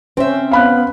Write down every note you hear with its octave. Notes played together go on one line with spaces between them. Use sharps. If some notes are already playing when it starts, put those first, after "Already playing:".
C4 C#4 C5 E5
B3 F5 B5 F#6